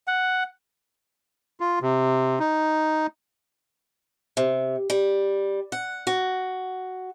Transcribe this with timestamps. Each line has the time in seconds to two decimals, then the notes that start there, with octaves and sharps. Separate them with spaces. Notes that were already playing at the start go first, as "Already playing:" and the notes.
0.07 F#5
1.60 F4
1.82 C3
2.40 D#4
4.37 C3
4.90 G3
5.72 F#5
6.07 F#4